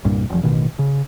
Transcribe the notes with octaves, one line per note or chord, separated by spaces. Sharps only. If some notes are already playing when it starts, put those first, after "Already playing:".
C2 G2 A#2
F1 F3
A1 B2 D#3
C#3